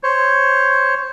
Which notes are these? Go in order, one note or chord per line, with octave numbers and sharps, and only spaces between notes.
C5 C#5